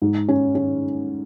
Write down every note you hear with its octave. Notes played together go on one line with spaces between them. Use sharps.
G#2
C#4
C#4